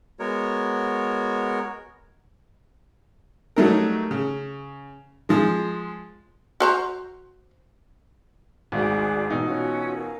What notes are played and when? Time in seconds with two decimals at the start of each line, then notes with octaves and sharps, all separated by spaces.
0.19 G#3 B3 F#4 A#4 C#5
3.56 F#3 G3 A3 D#4 A#4
4.11 C#3
5.29 F3 G#3
6.60 F#4 C5 A#5
8.72 G#1 D2 G#2 F#4 G#4 D5
9.30 E1 B2 D#4
9.44 C#4 F4 F#4
9.96 A#4 F5 G#5